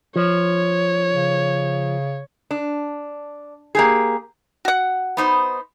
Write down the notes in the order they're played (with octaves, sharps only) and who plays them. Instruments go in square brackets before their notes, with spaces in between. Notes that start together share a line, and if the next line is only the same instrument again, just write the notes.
[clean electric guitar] F3 [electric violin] C#5
[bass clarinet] C#3
[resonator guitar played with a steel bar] D4
A#3 G4 G#4
[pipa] F#4 F#5
[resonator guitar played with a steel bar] B3 D#4 C5